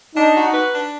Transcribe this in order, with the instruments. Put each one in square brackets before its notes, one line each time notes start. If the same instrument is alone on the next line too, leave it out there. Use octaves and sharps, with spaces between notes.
[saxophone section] D4 [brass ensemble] D#4
[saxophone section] F#4
B4
D4